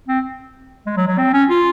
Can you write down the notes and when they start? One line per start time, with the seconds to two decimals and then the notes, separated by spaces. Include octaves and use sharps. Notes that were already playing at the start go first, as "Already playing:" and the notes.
0.08 C4
0.86 G#3
0.97 F#3
1.08 F#3
1.18 C4
1.33 C#4
1.50 F4